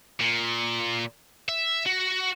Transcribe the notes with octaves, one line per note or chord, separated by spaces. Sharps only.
A#2
E5
F#4